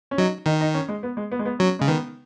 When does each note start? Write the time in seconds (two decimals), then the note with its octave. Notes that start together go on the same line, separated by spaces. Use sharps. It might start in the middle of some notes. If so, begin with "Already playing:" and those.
0.11 C#4
0.18 F#3 D#4
0.46 D#3 D#4
0.61 D#4
0.74 C#4
0.88 G#3
1.03 B3
1.17 G#3
1.32 B3
1.39 G#3
1.45 B3
1.59 F#3 C#4
1.79 C#3 G#3
1.88 D#3 B3